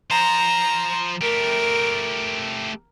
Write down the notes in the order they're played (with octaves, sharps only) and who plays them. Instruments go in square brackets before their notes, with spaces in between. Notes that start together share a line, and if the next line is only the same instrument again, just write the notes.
[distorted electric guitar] F3 C5 [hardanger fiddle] A#5
[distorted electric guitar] A3 G4 [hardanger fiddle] A#4